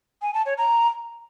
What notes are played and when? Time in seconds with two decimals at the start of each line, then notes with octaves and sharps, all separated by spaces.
0.22 G#5
0.34 A5
0.46 C#5
0.58 A#5